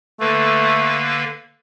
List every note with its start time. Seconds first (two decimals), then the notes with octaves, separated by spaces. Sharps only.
0.20 D3 A3 A#3 B4